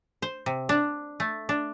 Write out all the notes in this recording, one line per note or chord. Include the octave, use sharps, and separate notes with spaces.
C5
C3
D4
A3
D4